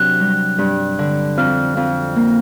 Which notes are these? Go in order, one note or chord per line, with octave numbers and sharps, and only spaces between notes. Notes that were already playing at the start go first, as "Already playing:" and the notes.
Already playing: C3 F#3 D4 F#6
G3
G2
D3
F2 F6
F2
A#3